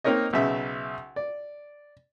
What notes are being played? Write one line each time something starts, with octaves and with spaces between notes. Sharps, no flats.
A#3 C4 D#4 A#4 C#5 D#5
B1 C#3 E5
D5